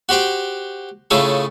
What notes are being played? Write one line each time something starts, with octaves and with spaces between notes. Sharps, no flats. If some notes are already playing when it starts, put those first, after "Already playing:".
F#4 G4 C5 G5
A2 C#3 A3 F4 G#4 A4